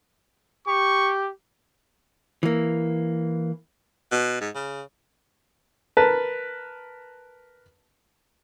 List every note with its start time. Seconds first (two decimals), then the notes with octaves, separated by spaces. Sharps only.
0.68 G4 C#6
2.43 E3 A#3
4.12 B2
4.41 G#2
4.55 C#3
5.97 A#4 B4 A5